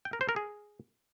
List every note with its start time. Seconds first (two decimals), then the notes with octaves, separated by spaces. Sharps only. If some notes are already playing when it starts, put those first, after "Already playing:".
0.05 G5
0.13 A#4
0.21 C5
0.29 A#4
0.36 G#4